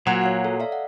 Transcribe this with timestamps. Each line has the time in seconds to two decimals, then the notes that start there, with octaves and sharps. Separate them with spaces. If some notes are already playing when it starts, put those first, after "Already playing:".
0.07 A#2 F#3
0.21 C#5 F5 C7
0.45 A4
0.60 D5 E5 F5
0.72 F#5